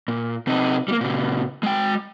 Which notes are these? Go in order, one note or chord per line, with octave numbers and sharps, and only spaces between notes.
A#2
C3 D#4
G3 A#3
A#2 C#3
G#3 G5